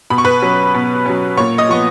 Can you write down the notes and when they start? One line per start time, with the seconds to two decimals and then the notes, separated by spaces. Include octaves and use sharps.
0.10 B2 B5
0.18 C#6
0.25 B4 B5
0.42 F#3 C#4
0.74 B2
1.06 F#3 C#4
1.37 A#2 C#5 C#6
1.58 D#5 D#6
1.69 F3 B3 C#6